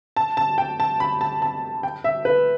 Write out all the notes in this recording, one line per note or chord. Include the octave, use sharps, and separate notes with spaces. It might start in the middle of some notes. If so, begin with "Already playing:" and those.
A5
A5
G5
A5
B5
A5
A5
G5
E5
B4